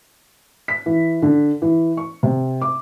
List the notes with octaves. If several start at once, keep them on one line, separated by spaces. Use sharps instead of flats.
B6
E3
D3
E3
C#6
C3
D6